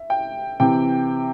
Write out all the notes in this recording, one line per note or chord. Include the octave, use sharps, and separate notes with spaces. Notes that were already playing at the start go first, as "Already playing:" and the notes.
Already playing: E5
G5
C3 E3 G5